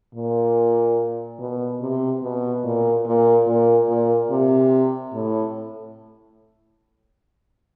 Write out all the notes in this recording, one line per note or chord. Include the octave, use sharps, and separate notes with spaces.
A#2
B2
C3
B2
A#2
A#2
A#2
A#2
C3
A2